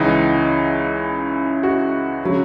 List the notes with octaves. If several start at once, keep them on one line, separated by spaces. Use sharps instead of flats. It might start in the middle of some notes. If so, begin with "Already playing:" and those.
Already playing: C#2 C#3 E3 D#4
F#4
C#3 F#3